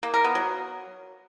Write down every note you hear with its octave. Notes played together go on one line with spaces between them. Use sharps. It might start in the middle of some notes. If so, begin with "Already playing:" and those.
A#3
A#4
B3
F#3